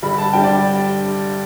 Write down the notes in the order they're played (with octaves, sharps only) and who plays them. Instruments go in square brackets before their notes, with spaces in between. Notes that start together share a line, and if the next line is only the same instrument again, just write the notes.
[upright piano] G2 D3 G3 B5
A5
G2 D3 G3 G5
D5